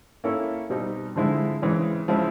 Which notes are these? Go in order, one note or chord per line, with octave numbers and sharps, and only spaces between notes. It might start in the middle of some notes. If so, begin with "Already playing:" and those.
A#3 C#4 E4 A4
B2 G3 C4 D#4
D3 F3 G#3 C4 E4
C#3 E3 G#3 C4
C#3 F3 G#3 C4 E4